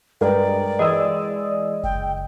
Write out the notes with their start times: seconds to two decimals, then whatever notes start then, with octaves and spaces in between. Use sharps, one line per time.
0.21 G2 G#3 A#4 B4 D5 G5
0.79 E3 G#3 D#5 D#6 E6
1.84 F#1 G5